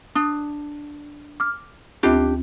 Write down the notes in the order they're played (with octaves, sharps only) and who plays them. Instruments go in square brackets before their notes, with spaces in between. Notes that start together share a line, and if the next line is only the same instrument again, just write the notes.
[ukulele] D4 [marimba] D#6
[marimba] D6 F6
[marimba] D2 C4 F4 [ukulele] D4 G4